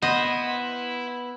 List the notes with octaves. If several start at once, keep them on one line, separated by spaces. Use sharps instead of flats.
B3 E4 C5 D#5